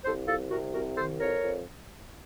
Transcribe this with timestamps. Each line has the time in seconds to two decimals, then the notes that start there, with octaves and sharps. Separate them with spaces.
0.05 C2 A4 C5
0.27 C2 F4 A4
0.51 C3 F#4 A#4
0.74 C2 F#4 A#4
0.97 D#3 A4 C5
1.20 F2 A#4 C#5
1.43 F2